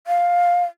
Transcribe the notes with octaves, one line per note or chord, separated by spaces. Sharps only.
F5